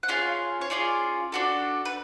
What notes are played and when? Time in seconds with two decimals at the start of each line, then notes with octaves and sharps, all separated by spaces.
0.03 F#5
0.09 C#4 F4 G#4 F5
0.61 C#5
0.70 C#4 F4 G#4 D5
1.32 D4 F#4 A4
1.85 B4